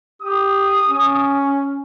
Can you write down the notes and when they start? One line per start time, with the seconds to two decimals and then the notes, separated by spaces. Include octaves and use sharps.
0.22 G4 D#6
0.88 C#4